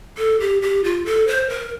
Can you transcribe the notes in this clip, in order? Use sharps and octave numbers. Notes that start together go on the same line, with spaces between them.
A4
G4
G4
F4
A4
C5
A#4